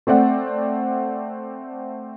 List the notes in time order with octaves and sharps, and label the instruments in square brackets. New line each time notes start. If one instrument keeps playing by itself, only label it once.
[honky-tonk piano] A3 C4 D5 F#5